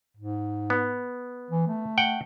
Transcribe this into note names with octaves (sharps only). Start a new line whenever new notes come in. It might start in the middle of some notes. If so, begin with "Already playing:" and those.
G#2
B3
E3
A3
F#5 G5